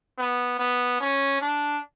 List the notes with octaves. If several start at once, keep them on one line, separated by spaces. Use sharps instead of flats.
B3
B3
C#4
D4